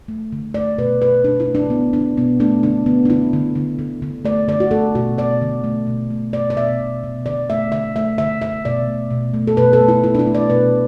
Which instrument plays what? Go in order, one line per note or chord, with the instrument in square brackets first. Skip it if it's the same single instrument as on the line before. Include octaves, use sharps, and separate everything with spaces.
[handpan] A3
D3
A3 D5
B2 B4
B2 B4
B2 D4
E4
A3
D4
D3 B3
D3 D4
B2 B3
A3 D4
D3 D4
D3 B3
D4
D3 E4
D3
D3
D3
D3
A3 D5
D3 D5
F#4
A3 A4
B2 F#4
B2 D5
D3
A3
B2
A3
B2 D5
D5
B2 E5
B2
B2
D3 D5
A3 E5
D3 E5
A3 E5
D3 E5
D3 E5
B2 D5
A3
B2
A3
A4
B2 B4
A4
A3
E4
B2 E4
D4
E4
A3
D5
B2 B4